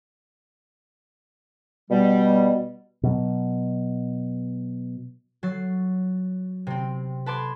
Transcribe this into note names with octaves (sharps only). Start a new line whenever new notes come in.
B2 G3
B2 F#3
F#3 A6 C7
C3 C4
B4 A5 C6 D6 G#6